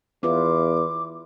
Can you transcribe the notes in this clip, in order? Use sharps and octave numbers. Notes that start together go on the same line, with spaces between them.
E2 E4 F4 B4 D6